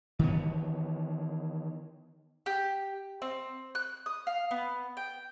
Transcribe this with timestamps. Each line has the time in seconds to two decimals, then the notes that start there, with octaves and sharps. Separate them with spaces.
0.19 D#3 E3 B3
2.46 G4
3.22 C4
3.75 F#6
4.06 D#6
4.27 F5
4.51 B3
4.97 G5